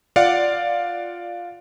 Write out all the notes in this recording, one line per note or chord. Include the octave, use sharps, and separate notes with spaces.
F4 D5 F5 F#5